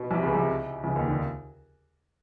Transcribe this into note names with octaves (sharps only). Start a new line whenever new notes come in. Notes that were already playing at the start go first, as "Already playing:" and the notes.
Already playing: B2
C2 C3
C#2 C#3
C2 C3
C#2 C#3
D#2 D#3
D3